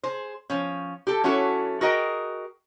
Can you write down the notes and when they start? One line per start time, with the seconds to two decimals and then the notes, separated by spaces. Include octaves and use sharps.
0.03 G#4 C5
0.50 F3 C#4
1.07 G4 A4
1.24 F#3 C#4 E4 F#4 A4
1.81 F#4 G#4 A#4 D#5 G5